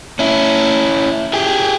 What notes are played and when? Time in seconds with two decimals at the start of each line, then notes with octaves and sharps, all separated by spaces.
0.19 C#4 E4
1.33 G4 G#4